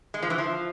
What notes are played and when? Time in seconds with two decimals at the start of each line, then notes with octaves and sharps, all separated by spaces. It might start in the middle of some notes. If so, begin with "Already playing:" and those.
0.14 G#3
0.22 F3
0.30 E3
0.38 F3